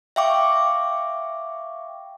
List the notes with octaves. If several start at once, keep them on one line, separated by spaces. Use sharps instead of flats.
E5 F5 G5 C#6 D6